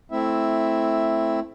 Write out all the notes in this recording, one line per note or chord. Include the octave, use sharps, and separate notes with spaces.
A3 C4 E4 E5